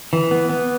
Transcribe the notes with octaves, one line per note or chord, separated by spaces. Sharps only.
E3
B3
B3